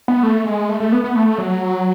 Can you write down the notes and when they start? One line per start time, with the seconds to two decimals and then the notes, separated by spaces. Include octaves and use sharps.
0.08 B3
0.23 A3
0.46 G#3
0.69 A3
0.80 A3
0.92 B3
1.04 B3
1.16 A3
1.38 F#3